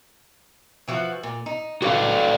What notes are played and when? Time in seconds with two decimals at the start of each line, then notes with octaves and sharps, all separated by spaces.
0.88 E3 F3 F#4
1.23 A#2
1.46 D#4
1.82 E3 G3 D4 F#4 A4 F5